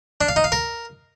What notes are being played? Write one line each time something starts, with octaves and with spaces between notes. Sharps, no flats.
D4
F5
D#4
F5
A#4